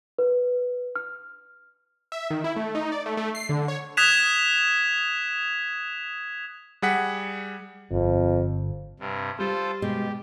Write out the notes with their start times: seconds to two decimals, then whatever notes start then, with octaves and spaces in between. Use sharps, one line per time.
0.19 B4
0.96 F6
2.12 E5
2.30 D#3
2.44 E4
2.56 A3
2.75 D#4
2.92 D5
3.06 A3
3.17 A3
3.35 C7
3.49 D3
3.68 C#5
3.97 D#6 F#6 G#6 B6 E7 F7
6.82 G3 G#4 F#5 B6
7.91 G1 F2
9.00 G2 C3
9.39 G3 F4 A4 C5
9.82 B2 G#3 G4